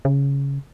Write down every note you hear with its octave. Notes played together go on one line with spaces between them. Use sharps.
C#3